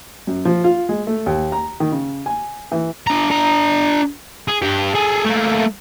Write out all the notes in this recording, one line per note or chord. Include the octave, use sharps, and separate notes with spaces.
F#2
F3
F4
G#3
A3
D#2
A#5
D#3
C#3
G#5
E3
D4 A#5
D4 A#5
G#4
G2 G4
G#4 A4
A3 A#3